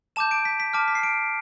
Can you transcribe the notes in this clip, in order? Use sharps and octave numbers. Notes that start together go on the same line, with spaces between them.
A5 D6 G6 E7
D7
B6
B6
A5 D6 F6
B6
C7
D7